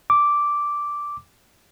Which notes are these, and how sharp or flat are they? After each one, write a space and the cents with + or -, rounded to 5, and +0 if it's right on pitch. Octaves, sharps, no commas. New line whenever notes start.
D6 -5